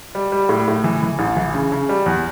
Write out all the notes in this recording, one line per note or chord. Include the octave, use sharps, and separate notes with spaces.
G3
G3
A2
A2
E3
E3
A1
E3
C#3
C#3
G3
E2